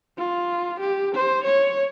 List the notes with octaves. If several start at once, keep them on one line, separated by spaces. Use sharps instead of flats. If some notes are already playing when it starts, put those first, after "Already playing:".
F4
G4
C5
C#5